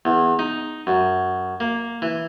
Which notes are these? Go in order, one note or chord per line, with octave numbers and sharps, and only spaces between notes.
E2
D#4
F#2
A#3
E3